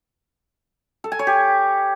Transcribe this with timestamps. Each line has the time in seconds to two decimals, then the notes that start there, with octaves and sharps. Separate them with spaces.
1.04 A4
1.12 G#5
1.19 C#5
1.27 G4